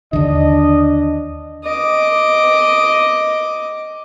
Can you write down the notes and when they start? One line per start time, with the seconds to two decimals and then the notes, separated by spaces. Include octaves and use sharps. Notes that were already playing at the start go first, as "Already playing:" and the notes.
0.13 D#2 D3 D4 D#5
1.64 D#5 D6